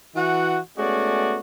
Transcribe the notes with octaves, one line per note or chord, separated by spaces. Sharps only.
E3 F#4 F#5
G#3 A3 B3 C#4 F#4 D5